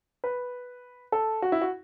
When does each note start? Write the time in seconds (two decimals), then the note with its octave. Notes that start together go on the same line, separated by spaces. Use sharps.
0.24 B4
1.12 A4
1.42 F#4
1.52 E4
1.61 F#4